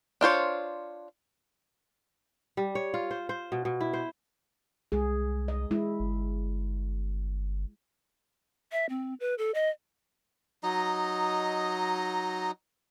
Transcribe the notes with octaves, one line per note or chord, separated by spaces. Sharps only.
D4 F4 C5 C#5
G3
C#5
F4
C5
C5
B2
B2
E4
C5
C2 G#3 G#4
D#5
G#3 E4
G1
E5
C4
B4
A4
D#5
F#3 D#4 D#5 A#5